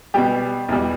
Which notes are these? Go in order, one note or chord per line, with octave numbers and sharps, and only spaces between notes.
B2 G3 G4
E2 B2 G3